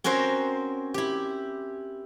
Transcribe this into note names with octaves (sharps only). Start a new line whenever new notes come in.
C4 C#4 F#4 A#4 C5
E4 G4